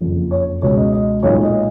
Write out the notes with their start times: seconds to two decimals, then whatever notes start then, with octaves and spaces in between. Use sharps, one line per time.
0.01 F#1 F2 F3
0.31 C#5
0.62 C#2 B2 G#3 C#5
0.76 D#5
0.92 D#5
1.23 B1 A#2 G#3 C#5
1.43 D#5